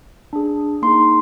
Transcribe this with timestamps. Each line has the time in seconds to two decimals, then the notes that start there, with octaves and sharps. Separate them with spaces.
0.33 D4 G#4
0.82 A#3 D#4 G#4 C6